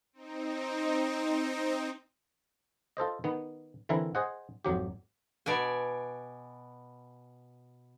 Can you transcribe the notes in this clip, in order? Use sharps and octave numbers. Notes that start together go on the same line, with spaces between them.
C4 D#4
F4 A4 C5 D#5
D#3 B3
D3 E3 C4 E4 A#4
G#4 C5 D#5 F#5
G#1 F2 F#3 G4
B2 D5 G#5